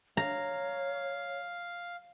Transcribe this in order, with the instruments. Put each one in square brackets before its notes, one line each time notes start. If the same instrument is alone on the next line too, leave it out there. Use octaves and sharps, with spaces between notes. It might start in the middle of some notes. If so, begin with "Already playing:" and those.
[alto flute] C#5 [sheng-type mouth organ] F5 [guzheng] A#5